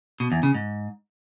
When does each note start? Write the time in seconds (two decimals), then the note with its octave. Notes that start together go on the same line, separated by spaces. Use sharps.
0.20 B2
0.32 E2
0.43 C#3
0.55 G#2